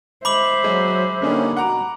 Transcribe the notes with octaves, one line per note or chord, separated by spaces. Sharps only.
G#3 C5 E5 B5 D6 F#7
F#3 G#3
D3 G3 A#3 C#4 D#4
B2 F#5 A#5 D6